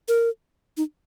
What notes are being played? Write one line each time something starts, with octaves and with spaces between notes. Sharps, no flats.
A#4
D#4